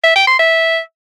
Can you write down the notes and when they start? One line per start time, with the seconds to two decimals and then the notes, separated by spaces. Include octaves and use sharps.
0.04 E5
0.15 G5
0.27 C6
0.39 E5